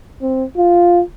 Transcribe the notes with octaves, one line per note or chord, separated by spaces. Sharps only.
C4
F4